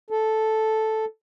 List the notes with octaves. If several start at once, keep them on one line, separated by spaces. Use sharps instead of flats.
A4